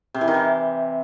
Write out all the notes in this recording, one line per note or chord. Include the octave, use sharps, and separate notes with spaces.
C3
E3
D#3
E3